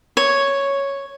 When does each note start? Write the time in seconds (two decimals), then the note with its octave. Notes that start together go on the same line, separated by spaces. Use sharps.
0.17 C#5